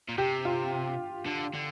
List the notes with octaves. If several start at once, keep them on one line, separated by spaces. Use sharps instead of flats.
A#2
C3 G4
F4
D3
D3